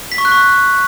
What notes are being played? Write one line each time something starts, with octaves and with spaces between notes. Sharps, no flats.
B6
C#6
F#6
C#6